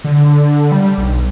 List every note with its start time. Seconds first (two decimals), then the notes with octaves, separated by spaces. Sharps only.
0.04 D3
0.72 G3
0.98 B1